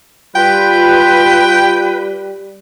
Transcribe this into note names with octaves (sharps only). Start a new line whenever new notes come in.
G3 F4 B4 G5